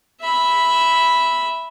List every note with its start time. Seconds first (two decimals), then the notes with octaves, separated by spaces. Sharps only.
0.22 E5 B5